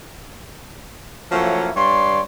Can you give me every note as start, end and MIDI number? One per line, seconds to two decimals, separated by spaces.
1.32 1.71 53
1.32 1.71 54
1.32 1.71 57
1.32 1.71 58
1.32 1.71 61
1.32 1.71 64
1.76 2.21 43
1.76 2.21 73
1.76 2.21 74
1.76 2.21 84